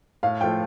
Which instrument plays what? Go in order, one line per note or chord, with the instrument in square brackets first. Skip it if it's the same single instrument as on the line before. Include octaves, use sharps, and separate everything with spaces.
[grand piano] A2 [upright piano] F5
[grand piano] F3 A3 F4 [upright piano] G5